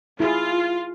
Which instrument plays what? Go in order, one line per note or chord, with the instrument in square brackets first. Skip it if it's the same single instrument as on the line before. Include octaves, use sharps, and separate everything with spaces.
[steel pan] E4 G#4 [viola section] F4